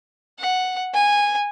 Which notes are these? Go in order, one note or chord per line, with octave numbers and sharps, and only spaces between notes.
F#5
G#5